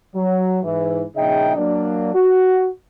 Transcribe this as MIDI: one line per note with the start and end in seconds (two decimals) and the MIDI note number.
0.15 0.59 54
0.63 1.02 44
0.63 1.02 52
1.16 1.55 34
1.16 1.55 49
1.16 1.55 63
1.16 1.55 75
1.16 1.55 76
1.16 1.55 79
1.56 2.12 54
1.56 2.12 58
1.56 2.12 62
2.14 2.66 66